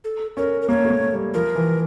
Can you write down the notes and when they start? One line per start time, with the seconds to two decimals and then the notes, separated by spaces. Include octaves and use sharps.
0.04 A4
0.37 C#4 A#4
0.62 A#4
0.69 A#3 C#5
0.85 A3
0.90 A#3
1.13 G3
1.34 F3 A#4
1.55 E3